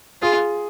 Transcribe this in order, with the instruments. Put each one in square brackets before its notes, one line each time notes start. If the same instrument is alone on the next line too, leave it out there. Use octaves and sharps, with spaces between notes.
[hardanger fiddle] F4 [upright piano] G#4